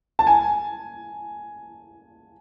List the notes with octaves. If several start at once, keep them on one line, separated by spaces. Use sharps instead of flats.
A5
G#5